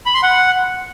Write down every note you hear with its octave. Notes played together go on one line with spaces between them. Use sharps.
B5
C6
F#5